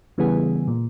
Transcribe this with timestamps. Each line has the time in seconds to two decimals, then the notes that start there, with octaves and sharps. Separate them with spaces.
0.18 C#3 E3 G3 B3 G#4
0.68 A#2